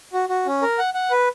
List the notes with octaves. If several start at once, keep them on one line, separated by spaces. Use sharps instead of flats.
F#4
F#4
C#4
A#4
F#5
F#5
B4